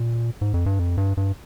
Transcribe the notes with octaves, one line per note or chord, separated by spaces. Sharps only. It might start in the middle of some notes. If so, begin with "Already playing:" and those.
Already playing: A#2
G#2
F2
G2
F2
G2
G2